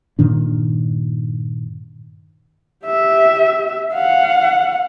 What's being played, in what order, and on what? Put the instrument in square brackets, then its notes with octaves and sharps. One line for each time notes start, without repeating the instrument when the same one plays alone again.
[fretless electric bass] G2 A#2 D#3 D4
[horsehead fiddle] G4 E5
F5 F#5